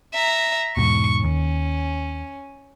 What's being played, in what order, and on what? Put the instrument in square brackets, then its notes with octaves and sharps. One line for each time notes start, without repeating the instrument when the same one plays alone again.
[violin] E5 A#5
[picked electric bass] E2 G#2 B2 [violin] C#6
[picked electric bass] D#2 [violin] C#4